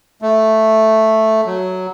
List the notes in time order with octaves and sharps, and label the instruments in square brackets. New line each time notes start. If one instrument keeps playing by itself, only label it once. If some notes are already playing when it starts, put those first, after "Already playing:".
[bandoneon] A3
F#3